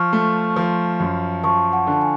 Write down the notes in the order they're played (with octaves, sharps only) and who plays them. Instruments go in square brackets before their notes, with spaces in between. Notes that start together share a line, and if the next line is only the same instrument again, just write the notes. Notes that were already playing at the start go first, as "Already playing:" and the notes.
Already playing: [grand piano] F3 [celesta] C#6 F6
[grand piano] A3
F3
F#2
[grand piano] F3 [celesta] A5 C#6
[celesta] F#5 A5
[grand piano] D3
[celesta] A5
G#5